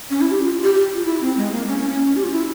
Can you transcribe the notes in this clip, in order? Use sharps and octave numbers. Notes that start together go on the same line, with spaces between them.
C#4
E4
G4
F4
G4
G4
F4
E4
C4
G#3
A#3
C#4
C#4
C#4
G4
F4
E4